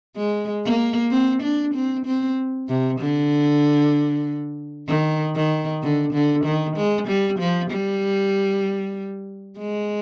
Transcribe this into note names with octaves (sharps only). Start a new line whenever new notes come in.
G#3
A#3
C4
D4
C4
C4
C3
D3
D#3
D#3
D3
D3
D#3
G#3
G3
F3
G3
G#3